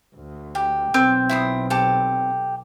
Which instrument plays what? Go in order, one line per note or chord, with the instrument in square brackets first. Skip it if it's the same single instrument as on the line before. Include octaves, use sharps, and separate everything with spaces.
[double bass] D2
[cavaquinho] G4
[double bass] B1 [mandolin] C4
[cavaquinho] E4 C6 D#6
G4 A4